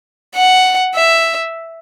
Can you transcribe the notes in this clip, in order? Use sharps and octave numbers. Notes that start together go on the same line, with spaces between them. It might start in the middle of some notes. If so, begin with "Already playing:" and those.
F#5
E5